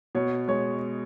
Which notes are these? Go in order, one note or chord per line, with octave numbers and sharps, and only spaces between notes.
B2 C#5
G#3 C#5